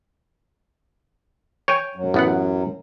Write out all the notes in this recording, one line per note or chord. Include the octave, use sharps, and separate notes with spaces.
C#5 G5 G#5
F#2 F#3
A1 B3 F#5